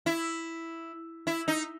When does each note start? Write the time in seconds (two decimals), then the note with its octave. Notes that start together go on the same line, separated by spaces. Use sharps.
0.06 E4
1.27 E4
1.48 D#4